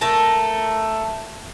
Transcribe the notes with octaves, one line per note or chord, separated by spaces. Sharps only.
A3 A#4 A5